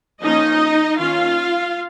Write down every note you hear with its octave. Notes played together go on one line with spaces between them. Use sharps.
F3 A#3 C#4 D#4 D#5
D#3 A#3 C#4 F4 F5